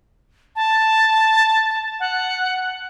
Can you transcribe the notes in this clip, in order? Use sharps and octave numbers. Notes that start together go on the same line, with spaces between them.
A5
F#5